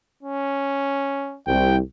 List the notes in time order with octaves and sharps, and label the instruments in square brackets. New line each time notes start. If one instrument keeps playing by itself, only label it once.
[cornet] C#4
[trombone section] C2 [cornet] G5